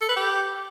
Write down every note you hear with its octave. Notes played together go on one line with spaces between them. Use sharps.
A4
B4
G4